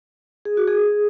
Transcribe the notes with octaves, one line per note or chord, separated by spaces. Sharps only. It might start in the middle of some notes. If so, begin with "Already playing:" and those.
G#4
F#4
G#4